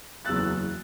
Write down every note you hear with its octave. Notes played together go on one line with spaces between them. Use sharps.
F#1 E2 F#3 E6 F#6 A6